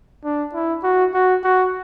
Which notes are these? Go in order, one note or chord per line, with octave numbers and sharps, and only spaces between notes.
D4
E4
F#4
F#4
F#4